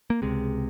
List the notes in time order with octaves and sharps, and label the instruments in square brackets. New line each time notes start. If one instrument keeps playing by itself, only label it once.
[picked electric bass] A#3
C#2 C3 G#3